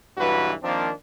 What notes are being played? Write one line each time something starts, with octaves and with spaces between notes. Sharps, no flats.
B1 G2 E3 F#4 B4
D#3 F3 A#3 C4 D4